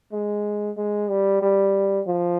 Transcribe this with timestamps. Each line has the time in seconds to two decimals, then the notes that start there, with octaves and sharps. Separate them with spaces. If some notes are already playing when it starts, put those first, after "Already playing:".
0.12 G#3
0.77 G#3
1.09 G3
1.42 G3
2.07 F3